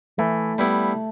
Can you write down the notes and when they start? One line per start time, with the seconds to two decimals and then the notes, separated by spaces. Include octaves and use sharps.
0.19 E3 A3
0.58 G3 B3 E4